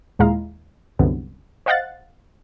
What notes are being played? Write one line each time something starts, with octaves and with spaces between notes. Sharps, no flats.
D#2 A#2 G#3 E4 F5 A#5
C2 F#2 D3 B3
C5 D#5 F5 F#5 F#6 A6